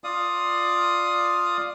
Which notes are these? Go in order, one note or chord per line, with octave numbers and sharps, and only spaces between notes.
F4 D5 F5 D#6